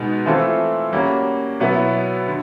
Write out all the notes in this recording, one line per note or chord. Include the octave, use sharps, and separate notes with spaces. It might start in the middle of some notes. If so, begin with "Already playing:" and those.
Already playing: B2 G#3 B3 D#4
E3 A3 C4 F4 A4
G3 A#3 C#4 F#4
B2 F#3 B3 E4
D3